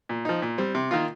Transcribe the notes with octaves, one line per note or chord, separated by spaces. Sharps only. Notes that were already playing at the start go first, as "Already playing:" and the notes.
A#2
F3 D#4
A#2
G3 C4
C3
D#3 A#3 F4